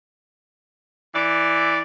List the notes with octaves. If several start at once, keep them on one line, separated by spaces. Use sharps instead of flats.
E3 D5